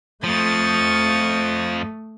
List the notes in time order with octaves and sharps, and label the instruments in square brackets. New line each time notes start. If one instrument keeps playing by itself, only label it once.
[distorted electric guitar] F2 F3 [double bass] A3 [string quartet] C#6 D#6 A6